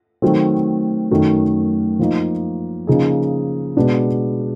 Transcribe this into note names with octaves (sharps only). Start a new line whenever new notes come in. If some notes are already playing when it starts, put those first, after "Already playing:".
D#3 F#3 A3 C4
F#2 D#3 F#3 A3
F3 A#3 D#4
C#3 F3 A#3 D#4 G#4
B2 G#3 B3 D4